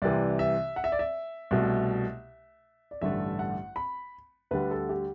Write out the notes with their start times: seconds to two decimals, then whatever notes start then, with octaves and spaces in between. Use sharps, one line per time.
0.02 C2 C3 E3 D5
0.39 E5
0.76 F#5
0.84 E5
0.92 D5
0.99 E5
1.51 C2 B2 A3
2.91 D5
3.01 A1 G2 D3 A3 E5
3.39 F#5
3.76 B5
4.51 D2 D3 G3 B4
4.71 A4
4.89 G4